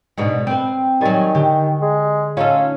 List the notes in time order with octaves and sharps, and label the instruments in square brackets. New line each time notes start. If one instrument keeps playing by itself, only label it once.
[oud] G#2 B2 D3
C4 B4
[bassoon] D#3 [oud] F#3 G3 [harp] G#5 C#6 A6
[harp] D3 [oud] G4
[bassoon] G#3
[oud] C#4 D#4 A4 [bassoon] F4